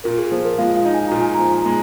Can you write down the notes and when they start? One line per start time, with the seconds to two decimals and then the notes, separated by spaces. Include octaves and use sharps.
0.04 A#2 A#4
0.18 G#4
0.31 F3 G#4
0.45 A#4
0.58 G#3 F4 F5
0.76 F4 F5
0.85 D#4
0.94 G#5
1.08 A#2 A#5
1.21 G#5
1.35 F3 A#5
1.49 G#5
1.62 G#3 A#5